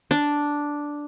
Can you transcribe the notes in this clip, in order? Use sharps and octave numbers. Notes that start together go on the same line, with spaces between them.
D4